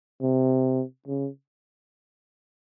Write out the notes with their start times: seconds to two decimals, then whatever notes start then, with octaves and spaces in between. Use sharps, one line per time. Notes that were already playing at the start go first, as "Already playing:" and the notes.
0.21 C3
1.08 C#3